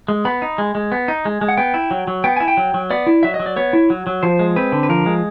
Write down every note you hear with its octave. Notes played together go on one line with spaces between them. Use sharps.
G#3
B3 B5
D#4
G#3
G#3
B3
D#4
G#3
G#3
F#5
B3 G5
E4
F#3
F#3
B3 G5
E4 G#5
G5
F#3
F#3
B3 D5
E4
F#3 E5
D#5
F#3
D5
B3 C#5
E4
F#3
F#3
F3 C5
G#3
C4 B4
D3
B4
F3 A#4
G#3